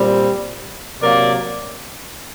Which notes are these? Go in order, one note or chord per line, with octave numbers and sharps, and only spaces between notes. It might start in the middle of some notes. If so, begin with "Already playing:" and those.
Already playing: A#2 G3 C4
C3 F#3 A#3 A#4 D5